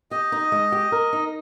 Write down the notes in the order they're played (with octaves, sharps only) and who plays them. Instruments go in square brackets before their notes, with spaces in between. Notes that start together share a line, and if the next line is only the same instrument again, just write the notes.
[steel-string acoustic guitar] G4 [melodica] D#5
[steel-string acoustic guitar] D#4
G#3
G4
A#4
D#4